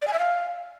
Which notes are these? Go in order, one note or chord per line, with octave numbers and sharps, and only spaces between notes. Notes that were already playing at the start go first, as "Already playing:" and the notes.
D5
G#5
E5
F5